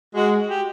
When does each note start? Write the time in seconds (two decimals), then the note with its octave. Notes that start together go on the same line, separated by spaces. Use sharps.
0.15 G#3 F#4
0.48 G4